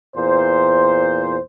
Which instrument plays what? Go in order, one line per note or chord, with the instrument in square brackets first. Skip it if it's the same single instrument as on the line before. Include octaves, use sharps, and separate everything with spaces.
[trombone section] E2 A#2 C5